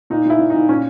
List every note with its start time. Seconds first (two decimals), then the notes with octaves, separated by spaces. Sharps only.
0.10 A#2 D#4
0.25 A#2 E4
0.39 A#2
0.50 A#2 D#4
0.69 A#2 C#4